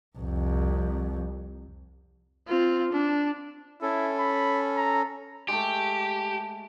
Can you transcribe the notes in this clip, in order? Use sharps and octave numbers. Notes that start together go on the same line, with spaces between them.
C2 F2
C4 F4
D4
C#4 E4 A4
B5
A#5
G#3 A3 G4